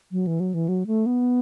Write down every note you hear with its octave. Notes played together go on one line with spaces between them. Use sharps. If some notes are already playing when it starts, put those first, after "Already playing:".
F#3
E3
F#3
E3
F#3
A3
B3